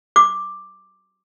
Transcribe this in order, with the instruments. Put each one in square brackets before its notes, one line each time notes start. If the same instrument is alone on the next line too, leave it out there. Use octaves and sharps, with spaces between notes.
[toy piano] D6